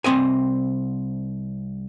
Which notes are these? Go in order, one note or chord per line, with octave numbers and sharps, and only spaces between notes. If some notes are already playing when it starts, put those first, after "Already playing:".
C2 C#3 C4 D#5 G#5